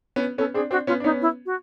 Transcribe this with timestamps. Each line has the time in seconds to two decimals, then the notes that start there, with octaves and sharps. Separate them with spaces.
0.16 B3 C#4
0.38 B3 C#4 A4
0.54 C4 D4 G#4
0.71 C4 D4 F#4
0.87 B3 C#4 F4
1.00 D4
1.04 B3 C#4 D#4
1.21 E4
1.46 F#4